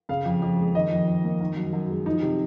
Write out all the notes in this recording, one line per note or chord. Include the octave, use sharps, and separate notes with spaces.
C#3 F5
F2
F2
G#3
D#3 D#5
F2
F2
A#3
D#3
F#2
F#2
G#3
F3 D#4
C3